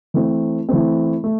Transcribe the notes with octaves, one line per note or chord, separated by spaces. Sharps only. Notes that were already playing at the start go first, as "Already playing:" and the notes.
E3 A3 C4
E3 A3 C4
A3